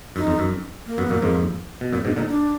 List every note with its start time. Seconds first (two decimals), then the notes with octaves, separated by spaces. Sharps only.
0.16 F#2 D#4
0.27 F2
0.39 F#2
0.86 A#3
0.98 F#2 B3
1.09 F#2 A#2 A#3
1.22 F2 G#2
1.81 B2
1.93 F#2 A#2 B3
2.05 G#2 B2 D4
2.16 A#2 D3 D#4
2.29 D4